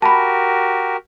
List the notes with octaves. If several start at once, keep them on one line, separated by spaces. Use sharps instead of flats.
F#4 G4 A#4 A5 B5